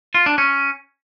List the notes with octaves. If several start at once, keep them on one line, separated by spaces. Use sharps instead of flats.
F4
D4
C#4